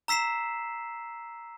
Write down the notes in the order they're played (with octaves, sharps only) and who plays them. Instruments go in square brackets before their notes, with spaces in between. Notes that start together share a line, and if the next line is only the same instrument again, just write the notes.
[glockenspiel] A#5 E6 B6 C7 E7